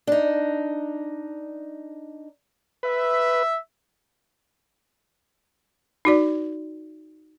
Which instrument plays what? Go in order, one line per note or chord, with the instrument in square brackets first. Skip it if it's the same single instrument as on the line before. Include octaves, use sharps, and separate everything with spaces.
[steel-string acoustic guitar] D4 D#4
[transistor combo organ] B4 [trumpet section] E5
[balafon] D#4 F#4 D5